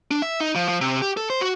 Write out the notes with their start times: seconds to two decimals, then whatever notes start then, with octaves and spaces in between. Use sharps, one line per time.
0.11 D4
0.22 E5
0.40 D#4
0.55 F3
0.68 F3
0.81 C3
1.02 G4
1.17 A4
1.30 C5
1.41 F#4